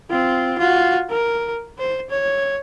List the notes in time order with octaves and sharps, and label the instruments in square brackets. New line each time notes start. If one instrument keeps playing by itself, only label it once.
[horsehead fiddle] C4 F4
F4 F#4
A#4
C5
C#5